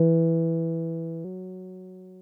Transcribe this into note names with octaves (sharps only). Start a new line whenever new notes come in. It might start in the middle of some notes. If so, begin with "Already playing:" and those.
Already playing: E3
F#3